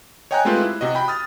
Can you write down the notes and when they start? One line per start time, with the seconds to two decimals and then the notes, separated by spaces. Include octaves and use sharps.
0.31 C#5 D#5 G5 G#5 A#5 F#6
0.45 G#3 A3 C4 F4 G4 B4
0.62 E4
0.81 C3 F#4 D#5
0.95 G5 B5
1.08 D#6 F6 A6